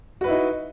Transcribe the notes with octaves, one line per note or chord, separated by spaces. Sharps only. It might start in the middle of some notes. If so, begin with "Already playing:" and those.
D#4 E4 F#4 B4